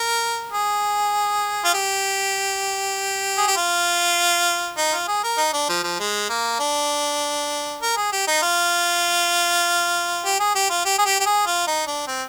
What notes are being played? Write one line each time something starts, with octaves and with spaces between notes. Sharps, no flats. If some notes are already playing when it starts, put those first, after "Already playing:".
Already playing: A#4
G#4
F4
G4
G#4
G4
F4
D#4
F4
G#4
A#4
D#4
D4
F3
F3
G#3
A#3
D4
A#4
G#4
G4
D#4
F4
G4
G#4
G4
F4
G4
G#4
G4
G4
G#4
F4
D#4
D4
C4